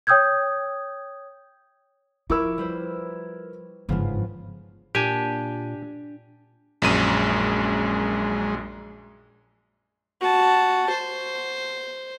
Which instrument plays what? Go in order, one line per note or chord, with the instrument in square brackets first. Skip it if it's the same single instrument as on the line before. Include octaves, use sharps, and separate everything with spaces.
[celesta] C#5 G5 D#6 E6 G6 G#6
[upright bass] F3 [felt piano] E4 A#4 E6 [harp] B5 C#6 D6
[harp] G3 B4 C5
[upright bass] G1 G#2 [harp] C#3 F3 B3
[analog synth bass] A#2 [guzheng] D4 [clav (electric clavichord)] G4 G#5
[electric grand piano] A#1 F#2 D#7 [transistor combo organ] G#3
[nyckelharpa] F#4 A5
C5